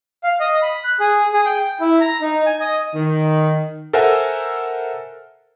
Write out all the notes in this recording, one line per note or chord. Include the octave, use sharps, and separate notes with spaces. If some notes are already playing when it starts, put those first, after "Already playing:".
F5
D#5
B5
F#6
G#4
G#4
G5
E4
A#5
D#4
G#5
D#5
D#3
A4 A#4 C5 E5 F#5 G#5